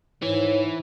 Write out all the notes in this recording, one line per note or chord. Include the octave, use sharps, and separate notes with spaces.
G#2 E3 C#5